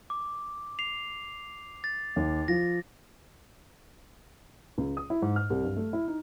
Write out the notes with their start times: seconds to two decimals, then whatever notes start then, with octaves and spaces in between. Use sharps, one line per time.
0.10 D6
0.79 C7 F7
1.84 A6
2.16 D#2
2.48 F3 F4 A#6
4.78 C#2
4.97 D#6
5.10 E4
5.22 G#2
5.36 F6
5.50 C2
5.64 G2
5.76 A3
5.93 E4
6.08 D#4